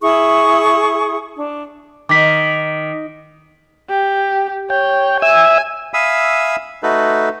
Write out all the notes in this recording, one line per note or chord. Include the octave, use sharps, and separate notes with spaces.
E4 G#4 C#6 D#6
D4
D#3 D6 B6
G4
C#5 G5
E5 G#5 E6
E5 F5 G#5 B5 D#6 E6
A3 D#4 F#4 A4 B4